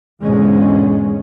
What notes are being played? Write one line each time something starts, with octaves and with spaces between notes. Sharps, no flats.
E2 G#2 B2 D3 G#3 C#4